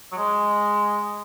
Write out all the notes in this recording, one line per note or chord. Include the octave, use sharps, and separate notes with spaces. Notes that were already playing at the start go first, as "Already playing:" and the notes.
F#3
G#3